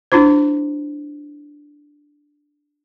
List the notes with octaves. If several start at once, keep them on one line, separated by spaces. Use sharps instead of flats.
D4 E4 F4 C5